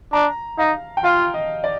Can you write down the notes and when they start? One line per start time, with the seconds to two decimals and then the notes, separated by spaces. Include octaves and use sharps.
0.13 D4 A#5
0.58 D#4 F5
0.97 G5
1.04 F4 F5
1.34 D#5
1.64 D5